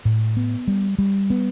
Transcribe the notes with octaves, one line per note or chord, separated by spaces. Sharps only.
A2
B3
G3
G3
B3